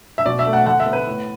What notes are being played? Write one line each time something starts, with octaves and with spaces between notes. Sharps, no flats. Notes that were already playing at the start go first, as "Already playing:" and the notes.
E5
B2 D5
E5
A3
F#5
D3 F#5
E5
B3
B4
A2